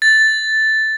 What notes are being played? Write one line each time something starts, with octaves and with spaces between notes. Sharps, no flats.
A6